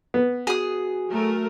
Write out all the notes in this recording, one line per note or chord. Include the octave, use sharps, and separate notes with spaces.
B3
F#4 G#4 D#6
F#3 A3 A#4